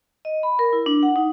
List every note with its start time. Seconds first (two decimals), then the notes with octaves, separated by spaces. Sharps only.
0.25 D#5
0.43 B5
0.59 A#4
0.73 E4
0.86 D4
1.03 F#5
1.16 D#4